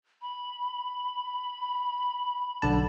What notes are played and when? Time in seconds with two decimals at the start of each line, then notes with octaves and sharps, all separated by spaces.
0.22 B5
2.62 B1 D3 A5